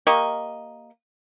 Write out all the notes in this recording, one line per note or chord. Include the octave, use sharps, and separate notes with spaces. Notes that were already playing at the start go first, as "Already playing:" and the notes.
A#3 G4 D#5 C#6